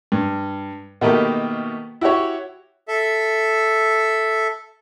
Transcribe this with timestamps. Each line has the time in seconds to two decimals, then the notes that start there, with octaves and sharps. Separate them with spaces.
0.12 G2
1.01 B2 D#3 A3 A#3 G4
2.01 E4 F#4 G4 C#5
2.88 A4 E5